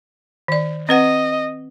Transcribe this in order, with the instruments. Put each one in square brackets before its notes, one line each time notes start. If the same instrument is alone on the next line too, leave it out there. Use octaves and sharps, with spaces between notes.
[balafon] D#3 D5
[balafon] C4 B4 F#5 [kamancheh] D#5